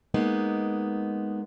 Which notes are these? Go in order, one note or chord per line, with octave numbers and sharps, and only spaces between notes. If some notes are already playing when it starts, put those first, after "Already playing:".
G#3 A#3 B3 D#4